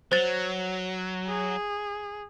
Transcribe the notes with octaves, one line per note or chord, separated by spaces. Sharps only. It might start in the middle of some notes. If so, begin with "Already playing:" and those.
F#3 C5 A6
G#4